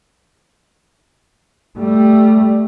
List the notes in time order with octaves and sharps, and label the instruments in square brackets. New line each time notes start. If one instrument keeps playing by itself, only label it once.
[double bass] G3 A3